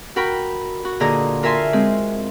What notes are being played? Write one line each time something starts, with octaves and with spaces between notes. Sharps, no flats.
F#4 A#4 G5 B5
F#4
A#2 D3 G#4 D#5 A#5
F4 A#4 E5 G#5 A5 C6
G#3 C4